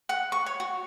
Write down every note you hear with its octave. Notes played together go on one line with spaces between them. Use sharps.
F#5
C#6
C#5
F#4